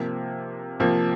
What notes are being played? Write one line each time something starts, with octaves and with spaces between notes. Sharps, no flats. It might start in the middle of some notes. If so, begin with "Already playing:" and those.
Already playing: C3 F3 A#3
C3 F3 A#3